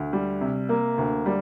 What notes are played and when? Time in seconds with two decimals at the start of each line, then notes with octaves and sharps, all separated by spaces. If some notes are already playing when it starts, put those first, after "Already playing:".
Already playing: D2
0.13 G3
0.41 C3
0.69 A#3
0.98 D2
1.26 G3